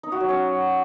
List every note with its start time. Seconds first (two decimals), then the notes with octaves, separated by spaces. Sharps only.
0.03 D#4
0.12 F#4
0.20 F#3
0.29 C#4